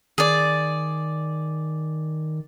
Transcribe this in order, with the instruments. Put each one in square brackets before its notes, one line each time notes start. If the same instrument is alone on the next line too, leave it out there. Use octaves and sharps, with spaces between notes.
[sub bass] D#3 [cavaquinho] G#4 D5